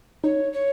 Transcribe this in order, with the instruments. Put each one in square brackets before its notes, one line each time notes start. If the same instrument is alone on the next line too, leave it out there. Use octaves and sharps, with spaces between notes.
[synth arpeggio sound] D#4 [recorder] C#5
[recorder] C#5